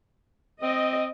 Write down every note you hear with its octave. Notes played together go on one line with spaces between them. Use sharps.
C4 D#5